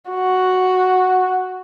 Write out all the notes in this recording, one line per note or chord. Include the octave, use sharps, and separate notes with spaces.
F#4